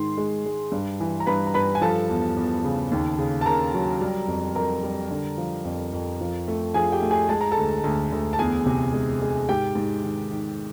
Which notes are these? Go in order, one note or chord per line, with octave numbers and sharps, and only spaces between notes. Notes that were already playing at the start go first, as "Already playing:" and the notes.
Already playing: G#2 D#3 C6
G#3
G#3
G2
E3
A#5
G2 B4 B5
A#5
G2 B4 B5
G#5
F3 A4 A5
E2
E2
C#3
D#2
C#3
A5
C#3 A#4 A#5
F#3
G3
F2
F2 A#4 A#5
G3
D3
F3
F2
F2
F3
A3
F3 G#4 G#5
G4 G5
A3
G#4 G#5
G#3 A5
A#5
A4 A5
D2
D2
D2
A5
E2 G#4 G#5
C3
G#3
G#3
G#2 G4 G5
G#2
D#3
D#3